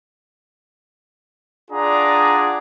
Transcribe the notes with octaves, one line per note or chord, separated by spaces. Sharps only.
D4 F4 G#4 D5 F#5 A#5